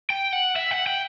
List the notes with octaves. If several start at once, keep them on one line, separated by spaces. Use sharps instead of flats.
G5
F#5
E5
F#5
G5